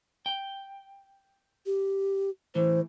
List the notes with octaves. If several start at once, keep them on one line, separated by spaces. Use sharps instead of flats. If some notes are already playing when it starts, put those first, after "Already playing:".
G5
G4
A2 E3 C5